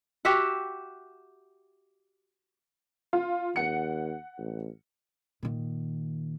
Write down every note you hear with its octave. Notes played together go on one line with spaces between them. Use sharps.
F#4 G4 E5 F#5
F4
D#2 F#5 C#7
A1
A#2 D#3